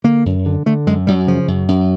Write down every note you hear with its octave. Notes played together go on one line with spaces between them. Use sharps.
D3 A#3
F#2
D3
D3 A3
F#2 G#3
F#2 G3
C#3 F3
F#2
F#2